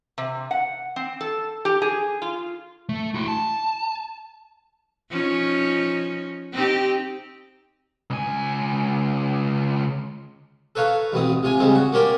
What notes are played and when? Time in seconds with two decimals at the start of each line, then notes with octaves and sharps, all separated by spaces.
0.18 C3
0.51 F#5
0.96 C4
1.21 A4
1.65 G4
1.82 G#4
2.22 F4
2.89 A3
3.14 E4 F#4
3.28 A5
5.10 F3 C#4 D#4
6.53 C4 D#4 G4
8.10 C#2 G#5
10.75 A4 B4 C#5 F5 A#5
11.12 A1 B2 C4 D#6
11.43 C3 F4 G#5
11.59 C#3 G3 G#3 C4
11.75 F#4
11.93 A#3 C#4 G4 A#4 C5 D5